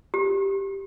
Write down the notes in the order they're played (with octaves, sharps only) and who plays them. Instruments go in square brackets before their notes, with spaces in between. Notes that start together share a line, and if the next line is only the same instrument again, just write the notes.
[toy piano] G4